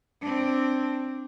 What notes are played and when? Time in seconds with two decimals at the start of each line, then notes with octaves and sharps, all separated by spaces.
0.21 C4 D4